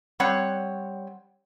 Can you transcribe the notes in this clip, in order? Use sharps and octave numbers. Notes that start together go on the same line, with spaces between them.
G3 C4 C#5 F#5